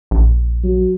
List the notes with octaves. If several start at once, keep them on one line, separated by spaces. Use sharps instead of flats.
A#1
F#3